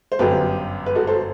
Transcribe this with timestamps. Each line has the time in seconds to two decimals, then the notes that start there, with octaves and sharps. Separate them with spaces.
0.12 C5
0.19 G1 F#2 F#3 G4 B4
0.86 B4
0.95 F#4 A4
1.07 A4 C5